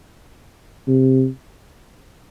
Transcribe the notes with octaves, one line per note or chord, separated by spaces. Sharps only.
C3